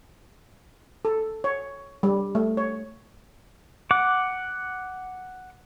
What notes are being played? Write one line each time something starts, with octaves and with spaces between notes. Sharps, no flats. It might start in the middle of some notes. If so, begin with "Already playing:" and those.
A4
C#5
G3
A3
C#5
F#5 D6